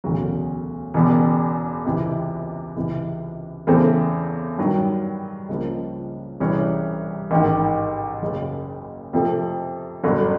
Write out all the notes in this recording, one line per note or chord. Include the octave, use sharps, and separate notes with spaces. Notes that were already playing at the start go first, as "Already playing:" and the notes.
E1 D2 C#3 F#3
E1 E2 C#3
C#2 C3 E3
C#2 C3 E3
E2 C#3 E3 A3 C4
G2 D#3 F#3
C#2 C#3 F3 A#3
C2 C3 E3 G#3 C#4
A1 G#2 D#3
F#1 F#2 C#3
F2 C3 F3 A3
G1 F#2 D3 F#3